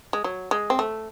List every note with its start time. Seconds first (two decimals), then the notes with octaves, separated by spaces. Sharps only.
0.13 G#3
0.24 F#3
0.51 G#3
0.70 C4
0.79 A3